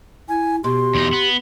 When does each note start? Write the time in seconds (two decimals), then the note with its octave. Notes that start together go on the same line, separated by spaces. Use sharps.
0.29 E4 G#5
0.64 B2 G4 C6
0.95 E2 D#4
1.13 B3